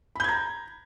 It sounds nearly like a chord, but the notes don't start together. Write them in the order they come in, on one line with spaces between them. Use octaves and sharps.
B5 G6 G#6 A#5